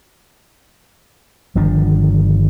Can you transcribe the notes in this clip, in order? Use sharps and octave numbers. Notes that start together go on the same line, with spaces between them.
G1 D#3 F3 D4